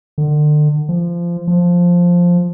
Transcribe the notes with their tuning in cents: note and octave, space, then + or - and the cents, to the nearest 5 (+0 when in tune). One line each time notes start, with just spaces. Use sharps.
D3 +35
F3 -20
F3 +5